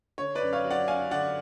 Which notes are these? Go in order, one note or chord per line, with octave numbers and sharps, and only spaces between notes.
D3 C#5
B4 D5
F#2
C#5 F5
F#3
D5 F#5
C#4 F5 G#5
D3 D5 F#5